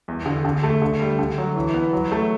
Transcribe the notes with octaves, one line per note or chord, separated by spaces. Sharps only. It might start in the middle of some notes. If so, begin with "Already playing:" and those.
E2
D3
D3
A3
D3
G3
D3
F#3
E3
B3
F#3
A3